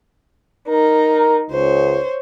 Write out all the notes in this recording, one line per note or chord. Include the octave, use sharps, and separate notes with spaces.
D#4 A#4
C#2 C5 C#5